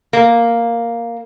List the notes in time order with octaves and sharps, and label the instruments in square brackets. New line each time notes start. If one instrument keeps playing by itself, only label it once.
[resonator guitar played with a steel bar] A#3